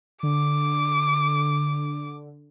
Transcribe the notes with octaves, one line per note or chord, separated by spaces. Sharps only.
D3 D6